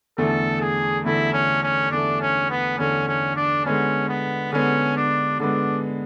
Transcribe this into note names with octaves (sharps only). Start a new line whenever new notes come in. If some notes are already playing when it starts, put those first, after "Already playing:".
E2 D3 A3 A4
G#4
E2 D3 A3 E4
C#4
C#4
E2 D3 A3 D4
C#4
B3
E2 D3 A3 C#4
C#4
D4
D3 G#3 B3 C#4
B3
D3 G#3 B3 C#4
D4
D3 G#3 B3 D4